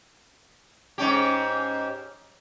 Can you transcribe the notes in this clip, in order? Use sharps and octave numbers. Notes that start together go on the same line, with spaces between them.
G#2 C#4 G4